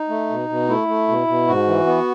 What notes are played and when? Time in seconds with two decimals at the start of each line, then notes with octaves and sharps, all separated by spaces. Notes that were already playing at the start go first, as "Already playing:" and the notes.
Already playing: D#4
0.09 A3
0.30 B2
0.49 B2
0.68 A3 E4
0.88 A3
1.08 B2
1.27 B2
1.47 G#2 F#4
1.67 E3
1.86 B3